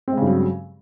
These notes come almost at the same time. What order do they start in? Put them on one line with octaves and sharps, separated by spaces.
C4 G#3 C#3 G2 F#3